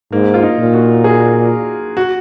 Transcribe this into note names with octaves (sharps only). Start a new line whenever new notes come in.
G#2 A#3
F4
D#4
A#2
F#4
G#4
F#4